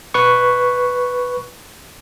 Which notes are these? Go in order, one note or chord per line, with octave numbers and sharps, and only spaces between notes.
B4 C#6